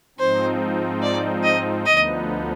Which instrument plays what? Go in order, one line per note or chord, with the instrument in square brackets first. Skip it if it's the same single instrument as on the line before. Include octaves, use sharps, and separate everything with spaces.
[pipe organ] G#2 F3 C4 D#4 [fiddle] C5
[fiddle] D5
D#5
[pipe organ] D2 D3 F3 B3 D#4 [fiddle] D#5